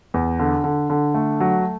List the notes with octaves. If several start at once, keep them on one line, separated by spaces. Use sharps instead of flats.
E2
D3
D3
D3
A3
F#3